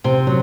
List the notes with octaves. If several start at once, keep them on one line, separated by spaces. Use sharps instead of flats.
C3 C4
F#3